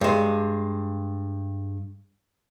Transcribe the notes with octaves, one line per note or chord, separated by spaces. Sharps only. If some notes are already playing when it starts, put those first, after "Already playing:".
G2 G#3